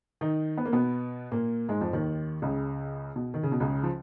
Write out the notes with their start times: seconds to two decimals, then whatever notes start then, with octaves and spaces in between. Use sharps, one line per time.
0.21 D#3 D#4
0.58 B3
0.65 A#3
0.73 B2 B3
1.32 A#2 A#3
1.69 G#2 G#3
1.81 F2 F3
1.93 D#2 D#3
2.42 C#2 C#3
3.16 B2
3.34 D#3
3.43 C#3
3.52 B2
3.60 C#2 C#3
3.83 F3